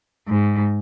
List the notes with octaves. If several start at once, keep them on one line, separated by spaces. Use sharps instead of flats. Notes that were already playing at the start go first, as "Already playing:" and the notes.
G#2